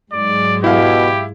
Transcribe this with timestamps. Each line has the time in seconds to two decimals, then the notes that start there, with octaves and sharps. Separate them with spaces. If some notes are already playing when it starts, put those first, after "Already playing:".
0.12 G#2 F#3 G#3 D5
0.64 B2 E4 G4 F5